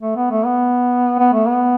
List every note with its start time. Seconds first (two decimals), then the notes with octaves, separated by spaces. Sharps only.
0.01 A3
0.16 B3
0.31 A3
0.45 B3
1.19 B3
1.33 A3
1.47 B3